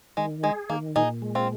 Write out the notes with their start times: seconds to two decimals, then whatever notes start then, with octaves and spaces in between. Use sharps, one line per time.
0.17 D#3 G#3
0.43 G#3 G#4
0.70 D#3 A#3
0.96 A#2 D#4 G#4
1.22 G#3
1.35 C4 F4